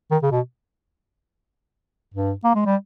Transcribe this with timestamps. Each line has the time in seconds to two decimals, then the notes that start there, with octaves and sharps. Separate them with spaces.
0.11 D#3
0.22 C#3
0.31 B2
2.14 G2
2.44 A#3
2.55 G#3
2.65 G3